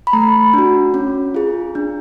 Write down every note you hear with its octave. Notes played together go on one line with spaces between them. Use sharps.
B5
A3 A#5
D4 F#4
C#4
F4 G#4
D4